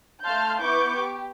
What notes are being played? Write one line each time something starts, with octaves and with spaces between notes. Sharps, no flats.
A3 F5 A5 C6 F6 G6
B3 E4 B4 C#6 D6 G6
G4